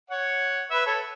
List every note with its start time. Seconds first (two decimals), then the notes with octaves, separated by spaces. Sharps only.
0.10 C#5 F#5
0.70 B4 E5
0.86 A4 C#5